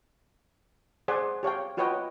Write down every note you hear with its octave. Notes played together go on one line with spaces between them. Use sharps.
G#4 C5 D5 F#5 G#5
G4 C#5 F5 G5
F4 F#4 B4 C#5 D#5 G5